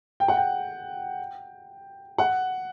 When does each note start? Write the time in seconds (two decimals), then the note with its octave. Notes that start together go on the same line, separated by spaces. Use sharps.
0.20 G5
0.28 F#5
0.37 G5
2.18 F#5